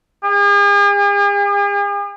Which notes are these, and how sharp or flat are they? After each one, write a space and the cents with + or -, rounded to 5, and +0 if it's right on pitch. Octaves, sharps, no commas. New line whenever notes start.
G#4 -45